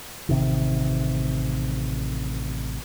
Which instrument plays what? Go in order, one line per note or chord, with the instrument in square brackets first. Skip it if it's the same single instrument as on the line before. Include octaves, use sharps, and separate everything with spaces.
[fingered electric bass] A1 C3 D#3